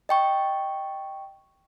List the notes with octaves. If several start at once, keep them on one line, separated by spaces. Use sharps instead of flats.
D#5 G5 C#6